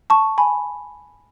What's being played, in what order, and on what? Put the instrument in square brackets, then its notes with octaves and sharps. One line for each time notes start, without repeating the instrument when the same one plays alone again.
[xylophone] A5 C#6
G#5 B5